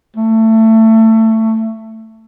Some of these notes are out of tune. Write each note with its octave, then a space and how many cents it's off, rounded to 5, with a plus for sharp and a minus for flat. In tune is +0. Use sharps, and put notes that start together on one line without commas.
A3 +20